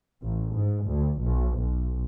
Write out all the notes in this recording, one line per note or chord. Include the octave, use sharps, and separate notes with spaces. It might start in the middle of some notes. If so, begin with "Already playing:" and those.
A1
G#2
D2
B1
B1